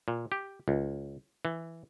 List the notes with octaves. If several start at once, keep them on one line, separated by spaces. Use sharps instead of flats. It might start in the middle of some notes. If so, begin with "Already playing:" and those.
A#2
G4
C#2
E3